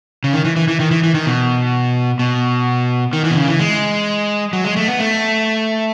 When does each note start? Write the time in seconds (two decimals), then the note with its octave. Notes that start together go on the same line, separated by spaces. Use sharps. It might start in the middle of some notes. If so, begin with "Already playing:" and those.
0.24 C#3
0.33 D#3
0.45 E3
0.56 E3
0.68 E3
0.80 D#3
0.91 E3
1.03 E3
1.14 D#3
1.26 B2
2.19 B2
3.13 D#3
3.24 E3
3.31 B2
3.37 C#3
3.48 E3
3.60 G#3
4.53 F#3
4.64 G#3
4.76 A3
4.88 B3
5.00 A3